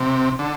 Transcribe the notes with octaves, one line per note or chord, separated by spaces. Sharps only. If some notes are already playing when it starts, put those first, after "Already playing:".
Already playing: C3
D3